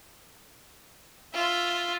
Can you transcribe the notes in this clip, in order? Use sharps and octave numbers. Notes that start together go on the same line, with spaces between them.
F4 E5